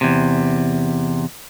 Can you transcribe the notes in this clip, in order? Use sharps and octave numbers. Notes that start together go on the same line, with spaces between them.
E2 C3